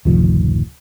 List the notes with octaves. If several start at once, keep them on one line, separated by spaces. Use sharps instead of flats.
F#1 D2 A2 C3 D#3 F3